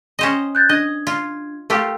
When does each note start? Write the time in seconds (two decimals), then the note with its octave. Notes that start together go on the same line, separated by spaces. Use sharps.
0.19 C#4 C5 D#5
0.55 F#6 G6 A6
0.69 D4 D#5 G#6
1.07 F4
1.70 A3 F4 G4 A#4 F5